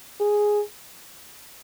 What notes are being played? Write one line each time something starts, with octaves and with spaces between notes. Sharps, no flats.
G#4